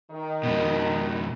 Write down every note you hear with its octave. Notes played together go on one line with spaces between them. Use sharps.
D#3
F2 B2